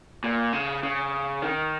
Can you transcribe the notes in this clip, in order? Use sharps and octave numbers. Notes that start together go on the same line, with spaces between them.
A#2
C#3
C#3
D#3